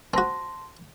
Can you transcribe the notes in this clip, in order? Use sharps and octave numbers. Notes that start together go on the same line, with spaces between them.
C4 F#4 A5 C6 A#6